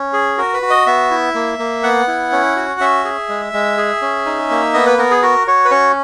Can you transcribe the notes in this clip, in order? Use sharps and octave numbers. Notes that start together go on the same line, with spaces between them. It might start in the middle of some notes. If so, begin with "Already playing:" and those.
Already playing: C#4
G#4
F#4 A#4
B4
F#4
D#5
B3 E5
E4
A#3
A#3
B3 F#5
E4
C#4
F#4
C#4 E5
G#4
G#3
G#3
G#4
C#4
D#4
A#3
B3 D#5
B4
B3 A#4
G#4
F#4 A#4
F#4 C#5
B4
C#4 C#5